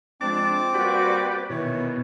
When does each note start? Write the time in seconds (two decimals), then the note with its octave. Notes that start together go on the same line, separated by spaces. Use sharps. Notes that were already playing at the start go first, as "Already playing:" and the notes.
0.21 F3 G#3 C4 D4 A5 D6
0.74 G3 A#3 F#4 G4 B4 D5
1.50 B2 D#3 E3 C#5